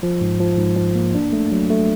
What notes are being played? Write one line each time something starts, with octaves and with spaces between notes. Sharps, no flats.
F3
G#2
F3
G#2
F3
A#3
D4
A3
F#3
A3